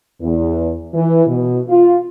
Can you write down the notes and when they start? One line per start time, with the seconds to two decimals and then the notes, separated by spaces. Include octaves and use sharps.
0.22 E2
0.94 E3
1.27 B2
1.69 F4